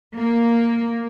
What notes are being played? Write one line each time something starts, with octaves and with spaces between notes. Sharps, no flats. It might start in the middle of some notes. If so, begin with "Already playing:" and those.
A#3